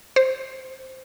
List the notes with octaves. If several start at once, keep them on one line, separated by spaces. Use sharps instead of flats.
C5